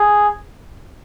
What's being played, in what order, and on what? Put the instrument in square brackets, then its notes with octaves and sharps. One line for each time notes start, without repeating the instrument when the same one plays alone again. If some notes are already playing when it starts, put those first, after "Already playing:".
Already playing: [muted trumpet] G#4